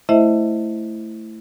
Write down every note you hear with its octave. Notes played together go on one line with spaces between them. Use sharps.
A3 E4 C5 D#5 E5